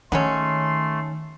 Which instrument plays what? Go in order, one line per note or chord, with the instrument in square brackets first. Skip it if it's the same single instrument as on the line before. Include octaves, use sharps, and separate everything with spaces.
[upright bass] D#3 [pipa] F#3 G#3 C#4 [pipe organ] A3 [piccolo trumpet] C6